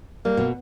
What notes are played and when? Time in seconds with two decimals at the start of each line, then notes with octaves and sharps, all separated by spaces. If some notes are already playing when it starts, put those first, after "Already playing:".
0.25 G3 A#3
0.37 B2